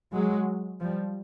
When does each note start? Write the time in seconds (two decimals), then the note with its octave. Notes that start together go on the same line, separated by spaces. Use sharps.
0.13 F#3 G#3
0.80 F3 G3